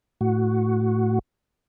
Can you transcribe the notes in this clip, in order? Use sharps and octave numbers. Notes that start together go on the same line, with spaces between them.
A2 F#4